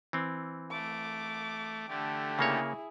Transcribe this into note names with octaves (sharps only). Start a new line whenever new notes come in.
E3 C4
A3 D6
D3 A3 G4
C#3 A#3 E4 G#4 C#5